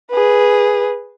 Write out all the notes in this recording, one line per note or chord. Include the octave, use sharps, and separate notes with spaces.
G#4 B4